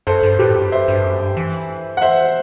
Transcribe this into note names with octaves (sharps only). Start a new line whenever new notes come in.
F#2 A4 C5
G2
A2 G4 B4
G2
C5 E5
G2
F#2
G2
E3
F#5
C5 E5